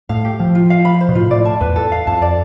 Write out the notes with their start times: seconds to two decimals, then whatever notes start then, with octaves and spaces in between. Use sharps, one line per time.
0.09 A2 F5
0.25 G4
0.39 F3 C5
0.55 F4
0.70 F5
0.85 B5
1.00 C5
1.09 B2
1.15 A2 F4
1.30 A2 D5
1.45 A5
1.61 E2 B4
1.76 A4
1.92 F5
2.07 F2 A5
2.22 D5